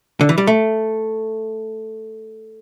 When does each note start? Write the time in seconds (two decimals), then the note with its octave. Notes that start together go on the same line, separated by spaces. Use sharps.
0.21 D3
0.29 E3
0.38 G3
0.47 A3